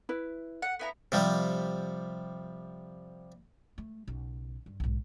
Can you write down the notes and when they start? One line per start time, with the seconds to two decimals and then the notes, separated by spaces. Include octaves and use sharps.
0.09 E4 B4
0.62 F#5
0.79 B3 E4 A#5
1.12 C3 F3 G3
3.78 A3
4.08 B1 C#3
4.66 G2
4.80 B1 G#2